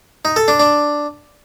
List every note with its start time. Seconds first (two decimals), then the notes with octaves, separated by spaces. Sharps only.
0.25 D#4
0.36 A4
0.48 D4
0.60 D4